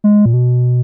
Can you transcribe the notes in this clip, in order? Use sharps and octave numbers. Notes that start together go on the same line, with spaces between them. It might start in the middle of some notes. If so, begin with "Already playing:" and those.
G#3
A#2
B2